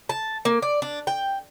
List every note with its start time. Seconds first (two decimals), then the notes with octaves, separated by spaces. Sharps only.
0.09 A5
0.45 A#3
0.62 D5
0.82 D4
1.07 G5